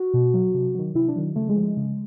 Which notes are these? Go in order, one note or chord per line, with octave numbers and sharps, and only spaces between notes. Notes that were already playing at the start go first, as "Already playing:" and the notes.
Already playing: F#4
B2
F#3
C3
D#3 F#3
C3 E4
D4
D#3 F#3
C#3 A3
G#3
F3
G#3
C#3